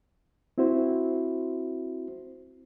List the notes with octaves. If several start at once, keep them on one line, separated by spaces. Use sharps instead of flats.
C4 E4 F#4 C5